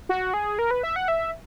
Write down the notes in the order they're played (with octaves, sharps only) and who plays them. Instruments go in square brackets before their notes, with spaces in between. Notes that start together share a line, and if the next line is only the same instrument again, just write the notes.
[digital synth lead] F#4
G#4
A#4
B4
E5
F#5
E5